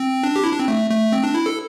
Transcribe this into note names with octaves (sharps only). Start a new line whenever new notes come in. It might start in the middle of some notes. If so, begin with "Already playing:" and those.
Already playing: C4
D4
G4
E4
D4
C4
A3
A3
C4
D4
E4
A4